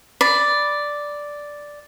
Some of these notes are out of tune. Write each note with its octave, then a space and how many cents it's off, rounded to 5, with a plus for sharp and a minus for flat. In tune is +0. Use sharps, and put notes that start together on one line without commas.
D5 +0 B5 +0